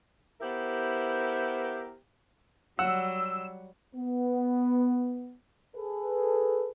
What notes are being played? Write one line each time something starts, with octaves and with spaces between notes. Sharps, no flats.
B3 E4 G4 A#4 C5
F#3 G3 F#5 E6
B3
G#4 A4 B4